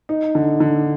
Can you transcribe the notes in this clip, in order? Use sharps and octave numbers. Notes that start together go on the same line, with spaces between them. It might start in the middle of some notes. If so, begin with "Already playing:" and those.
D#4
D3
D3